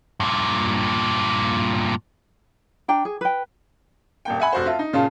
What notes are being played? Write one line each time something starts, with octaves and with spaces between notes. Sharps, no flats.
G2 A#2
D4 G5 A#5
G#4
B4 G5
D#1 A#3 G5
E5 F#5 G#5 B5
F1 F#4 C5
F4 E5 A5
D#4
A#2 C#3 C#4 F4 A5